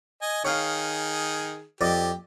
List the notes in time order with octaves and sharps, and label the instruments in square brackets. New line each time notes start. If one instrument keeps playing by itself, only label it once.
[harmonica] D#5 G#5
[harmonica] D#3 G#4 [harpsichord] C#5 F5
[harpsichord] F2 D5 D#5 [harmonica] G4